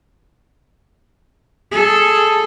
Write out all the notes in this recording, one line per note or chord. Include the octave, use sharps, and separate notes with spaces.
G#4 A4